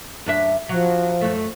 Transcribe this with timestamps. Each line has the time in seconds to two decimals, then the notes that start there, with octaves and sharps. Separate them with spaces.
0.26 F#2 D4 E5
0.69 F3 F#3
1.21 F#2 A3